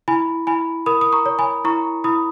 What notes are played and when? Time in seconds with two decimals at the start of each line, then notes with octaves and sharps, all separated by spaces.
0.08 E4 G#5 B5
0.47 E4 G#5 B5
0.86 A#4 B5 D#6
1.01 D#6
1.13 A#5 C#6
1.26 C#5
1.39 G#5 B5
1.65 E4 A#5 C#6
2.04 E4 B5 D#6